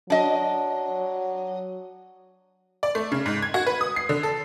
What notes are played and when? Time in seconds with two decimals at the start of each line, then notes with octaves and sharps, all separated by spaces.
0.10 F#3 D4 D#5
2.83 D5
2.95 A3
3.12 C#3
3.26 G#2
3.42 G#6
3.54 F#4
3.67 B4
3.81 D#6
3.96 C7
4.09 D3
4.23 A4